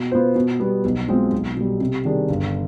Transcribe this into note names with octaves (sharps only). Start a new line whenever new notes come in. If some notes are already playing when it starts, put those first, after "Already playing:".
Already playing: B2
B3 F4 C5
B2
G3 B3
B1
B2 G#3 C4 F4
B1
B2 G3
C3
D#3 G3 D4 G#4
G1